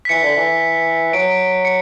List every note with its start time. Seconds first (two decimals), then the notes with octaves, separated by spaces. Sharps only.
0.05 B6
0.09 E3 C#7
0.23 D3
0.36 E3
1.13 F#3 D7
1.65 C#7